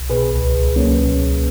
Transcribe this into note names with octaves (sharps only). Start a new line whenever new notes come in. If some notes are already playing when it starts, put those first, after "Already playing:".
Already playing: B1
B2 G#4 B4
C#2
C#2
F#3 A#3 C#4
B2
C#2